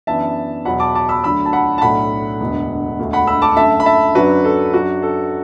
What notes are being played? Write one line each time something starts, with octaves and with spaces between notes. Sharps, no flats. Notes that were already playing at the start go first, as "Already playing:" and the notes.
F#2 E3 B3 D4 E5 A5
E2 B2 F#3 B3 F#5 B5
A5 D6
A5 D6
B5 E6
D2 D3 F#3 D4 B5 E6
A5
F#5 B5
A5
B1 A2 A3 D4 F#5 B5
E1 D2 D3 B3
E1 D2 D3 A3
F#5 B5
B5 E6
A5 D6
F#2 D3 A3 E5 A5
B5
E5 A5
F#2 D3 F#3 D4 F#4 B4
A4
F#2 F#3 D4 F#4
A4